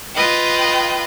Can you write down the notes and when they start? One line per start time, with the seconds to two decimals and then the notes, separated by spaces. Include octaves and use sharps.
0.15 F4 B4 D#5 G5